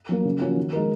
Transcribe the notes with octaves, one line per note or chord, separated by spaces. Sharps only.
F#3 A#3
C#3
F3 A#3 C#4 F#4
D#3
G#3 D#4 A#4